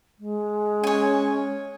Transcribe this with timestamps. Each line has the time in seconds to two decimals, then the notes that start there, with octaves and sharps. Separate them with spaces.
0.19 G#3
0.83 C#4 C#5 G#5